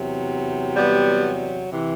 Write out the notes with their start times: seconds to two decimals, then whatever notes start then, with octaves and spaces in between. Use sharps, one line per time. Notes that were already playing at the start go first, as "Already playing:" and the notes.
Already playing: E2 C3 F#3
0.76 G3 B3
1.72 C3 E3